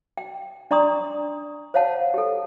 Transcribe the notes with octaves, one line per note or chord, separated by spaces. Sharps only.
G5
D4 D5 A#5 C6 C#6 D#6
C5 C#5 F5 F#5 A5
G4 A4